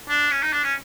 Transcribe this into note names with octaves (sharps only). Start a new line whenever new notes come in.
D4
C#4
D#4
D4
C#4